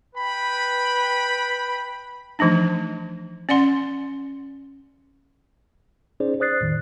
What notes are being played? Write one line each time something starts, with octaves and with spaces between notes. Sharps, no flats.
B4 G5 B5
E3 F3 A3 D4 D#4
C#4 D5 F#5 C6
C#4 D#4 G#4 C5 D5
C5 D5 D#6 F#6 A6 C7
E2 A2 D#3